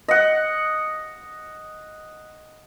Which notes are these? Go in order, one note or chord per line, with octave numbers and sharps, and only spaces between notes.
D#5 F#5